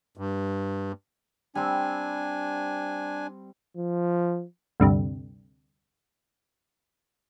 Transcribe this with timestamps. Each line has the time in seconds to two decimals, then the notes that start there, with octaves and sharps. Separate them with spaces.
0.17 G2
1.55 G3 C4 D4 G#5
3.77 F3
4.80 D2 G2 C3